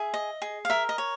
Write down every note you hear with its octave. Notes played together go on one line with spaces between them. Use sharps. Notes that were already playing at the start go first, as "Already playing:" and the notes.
Already playing: G#4 E5
D#5
G#4
F5
A#4 E5
D#5
C#5